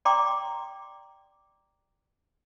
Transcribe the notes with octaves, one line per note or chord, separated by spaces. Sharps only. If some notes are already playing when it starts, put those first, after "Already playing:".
D5 G5 A#5 C6 D6